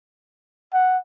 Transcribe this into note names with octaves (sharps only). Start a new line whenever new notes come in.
F#5